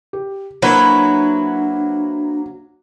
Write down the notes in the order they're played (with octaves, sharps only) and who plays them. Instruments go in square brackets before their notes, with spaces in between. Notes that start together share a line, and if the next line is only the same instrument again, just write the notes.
[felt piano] G4
[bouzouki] F#3 [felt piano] A#3 C5 [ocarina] D4 [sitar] E4 B4